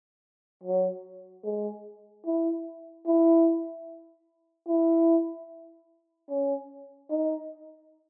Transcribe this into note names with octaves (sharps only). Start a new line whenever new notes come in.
F#3
G#3
E4
E4
E4
C#4
D#4